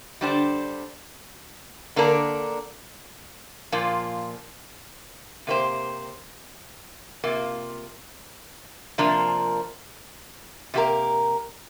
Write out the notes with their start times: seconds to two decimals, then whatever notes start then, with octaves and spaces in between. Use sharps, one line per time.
0.21 D3 G3 D4 G4 C5
1.96 D3 A#3 D4 A#4
3.72 A#2 F3 A#3 F4
5.47 C3 A#3 G4 C5
7.24 C3 A#3 F4
8.98 C3 F3 A#3 D4 A#4
10.74 C3 A#3 G4 A#4